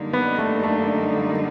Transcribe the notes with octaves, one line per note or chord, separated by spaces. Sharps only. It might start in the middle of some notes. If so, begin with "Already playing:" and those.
Already playing: F#2 D3 G3 A#3 D#4
B3
A3
A3